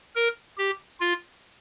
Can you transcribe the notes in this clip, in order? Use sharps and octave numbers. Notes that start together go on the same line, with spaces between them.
A#4
G4
F4